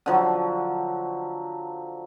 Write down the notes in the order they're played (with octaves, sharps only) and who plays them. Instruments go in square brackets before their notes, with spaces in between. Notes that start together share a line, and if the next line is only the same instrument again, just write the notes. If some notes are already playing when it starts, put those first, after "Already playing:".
[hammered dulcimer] D3 F3 F#3